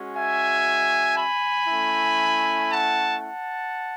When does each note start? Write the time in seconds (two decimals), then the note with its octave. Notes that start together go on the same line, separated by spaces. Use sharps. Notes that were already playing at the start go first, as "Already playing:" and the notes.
Already playing: G#3 C#4 F#4
0.16 E5 G#5
1.17 G#5 B5
1.68 A3 C#4 E4
2.70 F#5 A5
3.21 F#5 A5